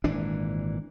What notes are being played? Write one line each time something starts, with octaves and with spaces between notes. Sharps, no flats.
G#1 A#2 E3 D4